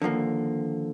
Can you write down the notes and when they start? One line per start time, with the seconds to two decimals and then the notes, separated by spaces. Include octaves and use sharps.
0.02 D3 D#3 F3 A#3